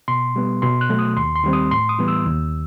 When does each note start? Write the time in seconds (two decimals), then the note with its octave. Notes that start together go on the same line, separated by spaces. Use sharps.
0.08 B2 C6
0.36 G3 B3
0.62 B2 C6
0.81 F#6
0.89 F#3 A3
0.99 D#6
1.17 D#2 C6
1.36 C6
1.44 D#3 G3 C4
1.53 D#6
1.71 A2 C6
1.89 D#6
1.99 E3 G3 B3
2.08 E6
2.26 D#2